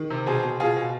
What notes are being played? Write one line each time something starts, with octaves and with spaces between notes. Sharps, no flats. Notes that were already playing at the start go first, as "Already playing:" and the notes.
Already playing: D#3
C3
B2 G#4 C5
B2
B2 F4 G#4
B2